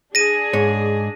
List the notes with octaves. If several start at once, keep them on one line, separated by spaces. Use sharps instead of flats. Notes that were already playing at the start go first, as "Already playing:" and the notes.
D4 G#4 A#6 D#7
G#2 C#5